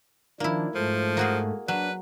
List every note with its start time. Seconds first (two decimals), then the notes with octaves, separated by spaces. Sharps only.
0.40 D#3 F3 A#3 D4 E4
0.75 G#2 F3 A3
1.17 A#3 F#4 G#4
1.68 F#3 D4 B4